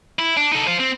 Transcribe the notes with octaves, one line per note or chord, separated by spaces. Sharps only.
E4
D4
D#4 A4
C5 F5
C4